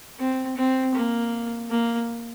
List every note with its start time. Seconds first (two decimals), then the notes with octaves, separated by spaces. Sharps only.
0.19 C4
0.56 C4
0.95 A#3
1.70 A#3